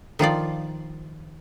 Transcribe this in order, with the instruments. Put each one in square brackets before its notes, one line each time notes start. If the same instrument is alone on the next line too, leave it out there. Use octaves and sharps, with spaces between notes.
[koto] D#3 F3 F4 D5